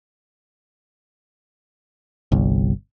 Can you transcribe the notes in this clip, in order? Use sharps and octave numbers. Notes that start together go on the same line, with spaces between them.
G1 C2